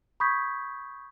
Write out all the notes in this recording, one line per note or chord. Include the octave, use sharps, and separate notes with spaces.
B5 C#6 D#6 G6 G#6 B6